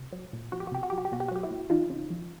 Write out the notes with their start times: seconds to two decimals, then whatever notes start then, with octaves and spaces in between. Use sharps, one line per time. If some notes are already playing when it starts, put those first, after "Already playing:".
Already playing: C3
0.12 F#3
0.33 A#2
0.52 F3 F#4
0.60 G4
0.67 F#4
0.72 C3 G4
0.83 F#4
0.90 F#3 G4
0.98 F#4
1.05 G4
1.12 B2 F#4
1.20 G4
1.28 F#4
1.31 F#3 G4
1.43 E4 F#4
1.50 A#2
1.70 E3 D#4 F4
1.90 C#3
2.10 F3